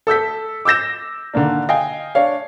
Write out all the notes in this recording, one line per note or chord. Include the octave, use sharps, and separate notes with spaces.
A4 E6 G6 B6
D6 E6 G6 A#6 E7
D3 D#3 A#3 D4
D#5 F5 G5 G#5
D4 C#5 F5